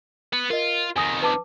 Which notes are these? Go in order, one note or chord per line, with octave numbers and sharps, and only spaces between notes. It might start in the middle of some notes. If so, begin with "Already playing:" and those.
B3
F4 A#4 D#5
F2 D#3 G#5 D#6 A#6
B4 A5 D6